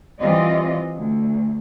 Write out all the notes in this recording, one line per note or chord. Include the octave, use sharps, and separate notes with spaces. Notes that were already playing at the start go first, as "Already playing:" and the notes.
E3 G3 C4 F4 D5 D#5
D2